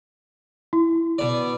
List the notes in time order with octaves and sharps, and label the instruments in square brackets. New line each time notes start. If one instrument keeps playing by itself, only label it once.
[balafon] E4
[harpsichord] B2 D5